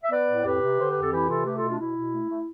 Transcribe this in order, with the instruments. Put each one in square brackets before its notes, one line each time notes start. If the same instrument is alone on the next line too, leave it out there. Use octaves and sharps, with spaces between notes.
[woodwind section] E5
B3 B4 D5
A2
F2 G4 B4
C3
D3 C5
F2 B4
A4
E3 E4 G4
C3 F4 A4
A3 G4 B4
F4 A4
B2
D4 F4
B2 E4
B2
A3
A3